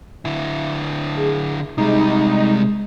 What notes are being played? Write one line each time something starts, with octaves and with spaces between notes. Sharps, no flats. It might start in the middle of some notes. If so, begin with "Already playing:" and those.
D3 E4
G#4
C3 G3 G#3 D#4